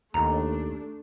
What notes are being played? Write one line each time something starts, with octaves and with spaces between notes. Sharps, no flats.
D#2 A3 D4 A#5